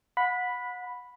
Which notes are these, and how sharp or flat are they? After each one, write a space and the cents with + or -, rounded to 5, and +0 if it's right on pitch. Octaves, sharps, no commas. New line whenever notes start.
F#5 -30 B5 +0